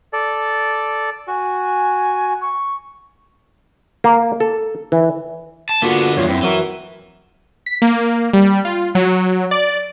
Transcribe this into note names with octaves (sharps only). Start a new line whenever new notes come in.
A4 D5
F#4 G#5
C#6
A#3
A4
E3
A5
D3 A#3 B3 F4 F#4
E2 G2 F4 C#5
F#2 C4 E4 C5
E3 F#3 F#4 A#4
B6
A#3
G3
F4
F#3
D5